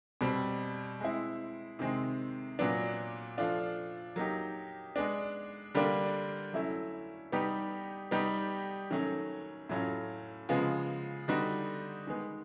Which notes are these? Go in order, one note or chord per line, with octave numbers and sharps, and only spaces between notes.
B2 G3 C4
G#3 C4 E4
C3 D#3 G#3 C4
A#2 F#3 B3 D4
F3 A3 D4 F4
F#3 A#3 D#4 G4
G#3 B3 D4
D3 G3 A#3 D4
F#3 A3 C#4 E4
G3 B3 D#4 G4
G3 B3 D#4 G4
D#3 F#3 A3 C#4
A2 F#3 A3 C#4 F4
C#3 F3 G#3 B3
D3 G3 B3 D#4 F#4
D#3 G#3 B3